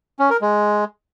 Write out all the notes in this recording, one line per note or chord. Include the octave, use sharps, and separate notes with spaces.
C#4
A#4
G#3